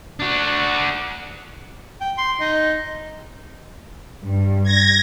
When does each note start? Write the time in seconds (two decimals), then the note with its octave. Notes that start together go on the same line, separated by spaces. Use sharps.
0.20 D4 F#4
2.01 G5
2.18 C6
2.40 D#4
4.23 G2
4.63 G#6 A#6